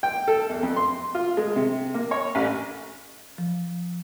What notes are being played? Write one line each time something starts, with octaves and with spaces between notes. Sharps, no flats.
G5
A4
E2
F2
C6
F4
G#3
C3
A#3
C#5
A1
F3